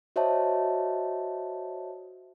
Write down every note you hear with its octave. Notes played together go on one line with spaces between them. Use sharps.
F#4 C5 C#5 D#5 E5 A5